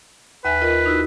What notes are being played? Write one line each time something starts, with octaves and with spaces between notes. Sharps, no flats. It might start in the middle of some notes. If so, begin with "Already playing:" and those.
D#2 B4 E5 G#5
F4 A#4 D#5
D#4 E4 F#4